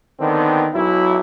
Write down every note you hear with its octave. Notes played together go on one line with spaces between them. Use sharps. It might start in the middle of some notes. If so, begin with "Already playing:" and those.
D3 D#3 B3 C4
B1 F#3 E4